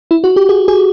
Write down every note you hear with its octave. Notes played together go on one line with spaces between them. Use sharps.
E4
F#4
G4
G#4
G#4